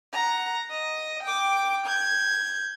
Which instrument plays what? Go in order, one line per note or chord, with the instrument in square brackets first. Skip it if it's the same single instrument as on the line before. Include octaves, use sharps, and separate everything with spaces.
[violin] F#5 A#5
D#5
G5 D6
G6 G#6